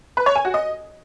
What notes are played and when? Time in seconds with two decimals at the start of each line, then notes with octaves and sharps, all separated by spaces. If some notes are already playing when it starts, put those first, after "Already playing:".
0.17 B4
0.26 C#5
0.35 G#5
0.45 F#4
0.54 D#5